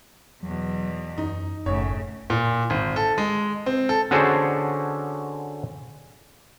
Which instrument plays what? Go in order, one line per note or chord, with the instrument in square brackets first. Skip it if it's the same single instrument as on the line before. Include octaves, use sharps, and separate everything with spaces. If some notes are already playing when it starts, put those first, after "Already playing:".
[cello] E2 B2 [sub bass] F#3
[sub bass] F#2 [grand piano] D#4
[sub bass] G1 [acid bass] F#2 [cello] A2 C#3 [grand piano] C#5
[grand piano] A#2
G#1
A4
G#3
C4
A4
[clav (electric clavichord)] D3 C#4 F#4 G#4 C5 A5